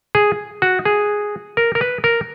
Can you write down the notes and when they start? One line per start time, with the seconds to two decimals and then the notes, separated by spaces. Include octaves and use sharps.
0.15 G#4
0.62 F#4
0.85 G#4
1.57 A#4
1.75 A#4
1.81 B4
2.04 A#4